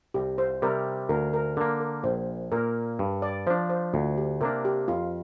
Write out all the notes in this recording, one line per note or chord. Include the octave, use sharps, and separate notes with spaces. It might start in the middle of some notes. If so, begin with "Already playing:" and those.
C2 G4
C5
C3 G3 A#4
D2 A#4
A#4
D3 A#3 A#4
A#4
A#1 C5
A#2 A#3 A#4
G2
D5
F3 D4 C5
C5
D2 F4
G4
C3 A#3 D4 A#4
G4
F2 F4